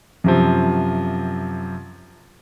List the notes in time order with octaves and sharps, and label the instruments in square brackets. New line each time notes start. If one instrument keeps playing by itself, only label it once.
[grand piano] F#2 C3 F3